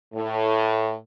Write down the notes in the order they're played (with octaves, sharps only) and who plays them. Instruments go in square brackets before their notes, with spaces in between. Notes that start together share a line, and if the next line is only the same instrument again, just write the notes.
[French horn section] A2